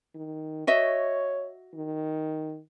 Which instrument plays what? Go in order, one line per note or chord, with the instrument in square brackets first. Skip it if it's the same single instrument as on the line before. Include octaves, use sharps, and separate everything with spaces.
[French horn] D#3
[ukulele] F#4 D#5 E5 [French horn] C#5
[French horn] D#3